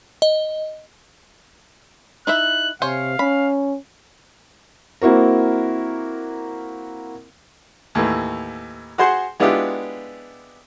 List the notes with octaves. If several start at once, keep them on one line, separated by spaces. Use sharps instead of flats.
D#5
D#4 E4 E5 F#6
C3 C5 C#5 F5 G#5
C#4 B5
A#3 C4 E4 F#4 A#4
D#2 A2 E3
F#4 G#4 C5 F#5 C6
G#3 B3 D4 E4 F4 G4